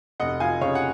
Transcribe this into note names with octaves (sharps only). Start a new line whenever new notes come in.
F1 D#5 F#5
F3 F5 G#5
C#3 C#5 F5
F#5